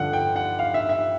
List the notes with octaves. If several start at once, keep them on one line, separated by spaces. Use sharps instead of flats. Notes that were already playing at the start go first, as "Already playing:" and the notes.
Already playing: G2 D3 F3 F#5
G5
F#5
F5
E5
E5